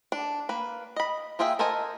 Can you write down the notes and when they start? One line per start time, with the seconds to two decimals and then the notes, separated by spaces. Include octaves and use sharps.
0.12 D4
0.49 A#3 B4
0.96 D#5 B5
1.39 A#3 F4 G#4 E5 G5
1.59 A4 A#4 C5 D#5 G#5